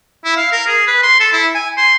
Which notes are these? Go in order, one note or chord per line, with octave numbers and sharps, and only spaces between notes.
E4
F5
A#4
G#4
B4
C6
A4
E4
G#5
C6